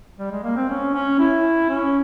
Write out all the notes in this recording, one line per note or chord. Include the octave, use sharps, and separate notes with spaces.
G3
G#3
A#3
C4
C#4
C#4
E4
C#4